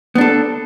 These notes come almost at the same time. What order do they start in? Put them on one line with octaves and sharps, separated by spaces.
B3 D4 A4